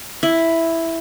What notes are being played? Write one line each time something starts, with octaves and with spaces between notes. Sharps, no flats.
E4